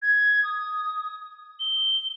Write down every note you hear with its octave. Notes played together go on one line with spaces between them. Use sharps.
G#6
D#6
G7